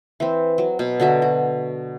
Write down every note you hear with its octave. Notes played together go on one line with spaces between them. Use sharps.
E3 C4
F#3
B2
D3 F#3 F#4 E5
F#4